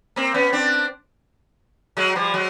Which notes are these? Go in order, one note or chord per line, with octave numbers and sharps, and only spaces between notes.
A#3 C4
B3 C#4
C4 D4
F#3 G#3
F3 G3
F#3 G#3